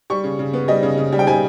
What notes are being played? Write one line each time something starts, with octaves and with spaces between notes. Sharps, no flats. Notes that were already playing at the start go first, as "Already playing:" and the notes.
G3 C#6
C#3
C#3
B3
G3 D#5
C#3
C#3
G3
G5
G3 G#5